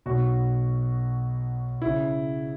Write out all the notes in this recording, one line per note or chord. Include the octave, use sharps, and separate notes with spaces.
B1 B2 F#4
C#3 E4